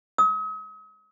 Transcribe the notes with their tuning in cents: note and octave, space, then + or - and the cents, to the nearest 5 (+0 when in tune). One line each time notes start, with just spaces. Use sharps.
D#6 +40